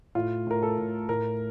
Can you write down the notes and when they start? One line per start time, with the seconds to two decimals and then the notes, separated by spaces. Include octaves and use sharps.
0.15 A2 F4
0.47 A2 A#4
0.63 A4
0.78 A2
1.09 A2 A#4